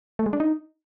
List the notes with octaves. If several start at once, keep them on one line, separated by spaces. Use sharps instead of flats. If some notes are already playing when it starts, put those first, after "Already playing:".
A3
G#3
D4
D#4